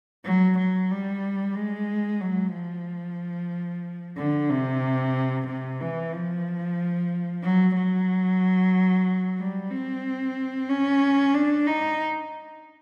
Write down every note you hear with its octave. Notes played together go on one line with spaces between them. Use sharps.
F#3
F#3
G3
G#3
F#3
F3
D3
C3
C3
E3
F3
F#3
F#3
G3
C4
C#4
D4
D#4